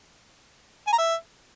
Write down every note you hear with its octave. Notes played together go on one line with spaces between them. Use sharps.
G#5
A#5
E5